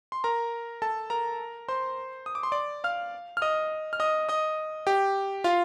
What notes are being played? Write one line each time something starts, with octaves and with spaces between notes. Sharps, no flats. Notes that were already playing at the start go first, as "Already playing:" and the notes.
C6
A#4 A#5
A4 A5
A#4 A#5
C5 C6
D#6
D6
C6
D5 D6
F5 F6
F6
D#5 D#6
F6
D#5 D#6
D#5 D#6
G4 G5
F4 F5